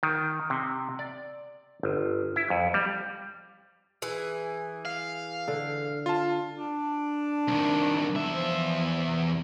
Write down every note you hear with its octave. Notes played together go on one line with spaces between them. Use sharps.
D#3
C3
D5
G1
E4
F2
G3
E3 G#4
F5
D3
F4 A5
D4
C2 D#3
E2 E5
F3
C3